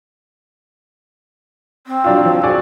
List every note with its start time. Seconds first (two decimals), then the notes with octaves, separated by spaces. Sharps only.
1.87 C4
2.04 F#3 D4 F4
2.25 F3
2.43 F#4 G#4 D5